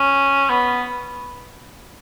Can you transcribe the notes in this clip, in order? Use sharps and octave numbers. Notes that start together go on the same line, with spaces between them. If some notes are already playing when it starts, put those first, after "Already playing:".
Already playing: C#4
B3